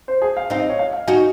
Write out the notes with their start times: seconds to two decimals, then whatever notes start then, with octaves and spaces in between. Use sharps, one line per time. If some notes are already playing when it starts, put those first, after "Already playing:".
0.08 C5
0.22 G#4
0.37 F5
0.50 C4 D#4 F5
0.60 D#5
0.69 C#5
0.79 F5
0.93 F5
1.07 D#4 F#4 G#5